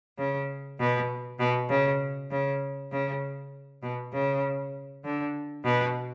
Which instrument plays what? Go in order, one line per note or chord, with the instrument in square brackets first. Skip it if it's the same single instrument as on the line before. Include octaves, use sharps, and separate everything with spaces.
[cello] C#3
B2
B2
C#3
C#3
C#3
B2
C#3
D3
B2